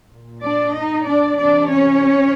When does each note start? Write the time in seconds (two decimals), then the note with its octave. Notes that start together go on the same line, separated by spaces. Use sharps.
0.11 A#2
0.42 D4 D5
0.75 D#4 D#5
1.06 D4 D5
1.38 C3 E3 D4 D5
1.70 C#4 C#5